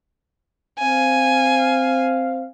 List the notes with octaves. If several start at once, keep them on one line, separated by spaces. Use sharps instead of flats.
C4 F5 G#5